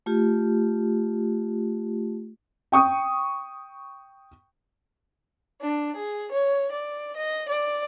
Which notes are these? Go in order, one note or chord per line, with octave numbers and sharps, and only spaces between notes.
A3 F4 G4
G5 C#6 D#6
D4
G#4
C#5
D5
D#5
D5